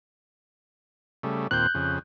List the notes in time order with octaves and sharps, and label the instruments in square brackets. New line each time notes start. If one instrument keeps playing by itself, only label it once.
[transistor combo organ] C#3 G3 A3
[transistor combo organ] D#2 A#2 C4 [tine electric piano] F#6 G6
[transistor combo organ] F2 C#3